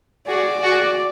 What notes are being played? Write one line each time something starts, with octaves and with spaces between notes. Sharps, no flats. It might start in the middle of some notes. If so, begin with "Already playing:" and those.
F#4 G#4 D5
F#4 G#4